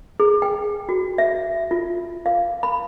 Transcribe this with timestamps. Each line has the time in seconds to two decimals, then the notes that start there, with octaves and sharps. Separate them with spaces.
0.20 G#4
0.42 G5
0.89 F#4
1.18 E5
1.71 F4
2.26 F5
2.63 B5